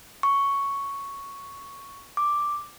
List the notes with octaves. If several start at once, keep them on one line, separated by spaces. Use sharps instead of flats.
C#6
D6